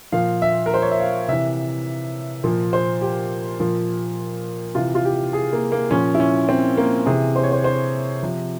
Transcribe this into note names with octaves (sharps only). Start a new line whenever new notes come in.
A#2 F3 F5
E5
A#4
C5
C#5
E5
F5
C3 E3 E5
A#2 F3
C5
G4
A#2 F3
C3 E3 F4
F4
G4
G#4
A#3
A#3
A#2 F3 C#4
E4
C#4
C4
A#3
C3 E3 G#4
C5
C#5
C5
C5
C3 F3